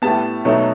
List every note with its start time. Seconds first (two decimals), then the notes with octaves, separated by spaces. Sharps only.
0.02 A2 G3 B3 A5
0.45 B2 F#3 A3 D#4